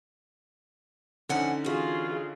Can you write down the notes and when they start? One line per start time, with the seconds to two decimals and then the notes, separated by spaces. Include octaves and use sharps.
1.29 D3 F3 C#4 D#4 F#5 G#5
1.65 E3 F4 F#4 G#4